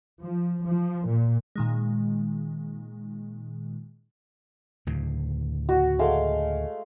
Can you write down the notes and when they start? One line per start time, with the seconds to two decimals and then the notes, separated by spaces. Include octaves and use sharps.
0.21 F3
0.66 F3
1.05 A#2
1.56 A#2 D#3 G#3
4.87 D2 A2 C#3
5.69 F#4
5.99 G#3 A3 F5